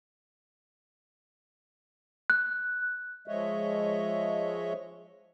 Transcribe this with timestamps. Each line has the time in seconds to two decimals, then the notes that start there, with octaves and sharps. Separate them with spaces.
2.30 F#6
3.28 F3 G#3 C#5 D#5 E5